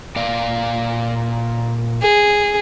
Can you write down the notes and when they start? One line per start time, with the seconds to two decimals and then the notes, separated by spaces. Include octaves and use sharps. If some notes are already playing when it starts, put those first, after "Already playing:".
0.16 A#2 D5 F5
2.02 G#4